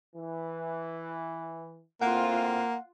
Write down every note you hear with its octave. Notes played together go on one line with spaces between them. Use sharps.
E3
A2 A#3 C4 F4 F#5